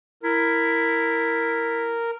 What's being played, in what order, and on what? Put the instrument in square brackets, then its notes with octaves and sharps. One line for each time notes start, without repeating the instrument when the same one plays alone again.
[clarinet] E4 [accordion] A#4